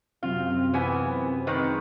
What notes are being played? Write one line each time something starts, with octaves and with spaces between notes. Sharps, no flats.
F#2 C3 C4 F4
E3 B3 G#5
D#3 G#3 B4